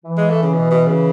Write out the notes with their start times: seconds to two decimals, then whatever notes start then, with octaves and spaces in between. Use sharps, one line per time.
0.05 E3
0.17 G#3
0.30 A3
0.43 C#3
0.55 B2
0.71 B2
0.88 C#3